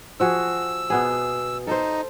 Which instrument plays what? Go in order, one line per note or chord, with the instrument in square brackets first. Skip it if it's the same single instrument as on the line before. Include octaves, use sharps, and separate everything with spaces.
[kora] F3 F#4 G#4 [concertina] E6
[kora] B2 B3 G#4
[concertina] D#4 [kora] A4 C5